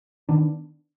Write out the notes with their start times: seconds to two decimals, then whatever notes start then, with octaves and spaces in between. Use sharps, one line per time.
0.29 D#3 B3 D4